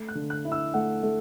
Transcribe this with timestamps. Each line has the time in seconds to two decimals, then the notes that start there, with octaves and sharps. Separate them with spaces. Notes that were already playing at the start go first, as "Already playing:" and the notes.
Already playing: A3
0.08 F#6
0.15 D3
0.30 F#6
0.45 E4
0.52 E6
0.74 A3 F#5
1.03 A3